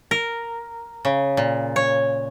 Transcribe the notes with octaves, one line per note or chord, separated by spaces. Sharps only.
A#4
C#3
A#2
C#5